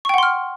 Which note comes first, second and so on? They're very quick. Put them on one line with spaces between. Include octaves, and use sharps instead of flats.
C#6 G5 F#5 C6 F6